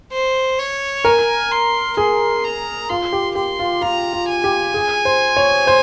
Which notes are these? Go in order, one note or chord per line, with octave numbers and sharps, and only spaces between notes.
C5
C#5
A#4 G#5
C6
G#4 C6
A#5
F4 C6
G4
G4 C6
F4
F4 A#5
F4
G#5
G4
G#4
C5
C#5
C5